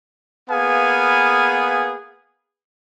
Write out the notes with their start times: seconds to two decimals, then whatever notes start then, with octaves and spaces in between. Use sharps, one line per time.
0.50 A#3 B3 G#4 B4 F5 G#5